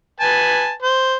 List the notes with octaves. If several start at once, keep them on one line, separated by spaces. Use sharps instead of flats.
B4 G#5 A5
C5